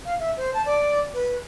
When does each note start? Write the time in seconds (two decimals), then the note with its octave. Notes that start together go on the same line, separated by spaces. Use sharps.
0.05 F5
0.19 E5
0.37 C5
0.54 A5
0.66 D5
1.14 B4